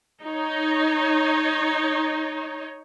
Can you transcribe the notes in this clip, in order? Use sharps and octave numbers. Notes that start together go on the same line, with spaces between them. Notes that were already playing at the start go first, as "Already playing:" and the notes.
D#4 C#5